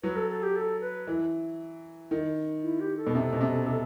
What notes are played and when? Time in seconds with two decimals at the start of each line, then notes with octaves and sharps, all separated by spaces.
0.03 F#3 B4
0.16 A4
0.30 A4
0.43 G4
0.56 A4
0.81 B4
1.07 E3
2.11 D#3
2.63 E4
2.80 G4
2.97 A4
3.07 B2
3.15 C3
3.33 B2
3.40 C3
3.67 C3